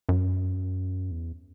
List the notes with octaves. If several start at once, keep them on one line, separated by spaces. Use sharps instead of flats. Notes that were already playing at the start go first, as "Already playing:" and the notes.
F#2
E2